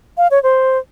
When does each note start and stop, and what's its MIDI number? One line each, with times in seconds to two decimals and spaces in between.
0.18 0.28 77
0.31 0.41 73
0.43 0.78 72